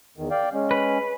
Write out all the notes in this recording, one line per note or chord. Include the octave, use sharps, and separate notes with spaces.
E2 D#3
D5 F5 G5
G#3 C#4
B4